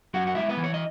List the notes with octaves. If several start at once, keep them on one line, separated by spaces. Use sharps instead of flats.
F#2 F#4 F#5
F#5
G#3 E4 E5
B3 B4
E3
C#5
D#5